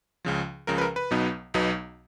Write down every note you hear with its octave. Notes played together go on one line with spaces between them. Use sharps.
C#2 C#3 F3
C#2 C#3 F3 A#4
B4
A#4
B4
B1 B2 F#3 B3 D#4
B1 B2 F#3 B3 D#4